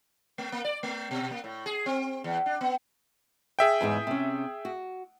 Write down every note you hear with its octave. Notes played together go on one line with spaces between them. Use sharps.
A3
A#3
D5
A3
B2
A#3
A2
G#4
C4
E2
D4
B3
G#4 E5 G5
E2 G#2 D#4
C3 C#4
F#4